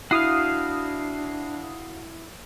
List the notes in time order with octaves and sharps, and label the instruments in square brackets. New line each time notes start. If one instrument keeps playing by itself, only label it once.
[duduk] D4 [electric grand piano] E4 [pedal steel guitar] F#4 F5 [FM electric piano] D#6 C7